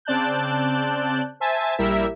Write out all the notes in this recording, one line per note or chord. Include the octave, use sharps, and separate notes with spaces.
C#3 C4 D5 A5 F#6 G6
C5 E5 G#5 A5 A6
A#1 G3 E4 G4 A#4 E5